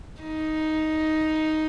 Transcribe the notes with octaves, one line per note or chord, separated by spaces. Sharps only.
D#4